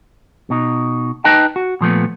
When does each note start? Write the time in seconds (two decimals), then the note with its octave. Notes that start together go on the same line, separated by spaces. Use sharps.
0.50 B2 D#4
1.24 D#4 B4 D#5 G5 A5
1.56 F#4
1.81 A#2 F3 A3 B3